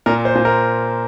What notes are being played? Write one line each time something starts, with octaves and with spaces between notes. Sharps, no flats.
A#2 A#4
C5
A#2
A#4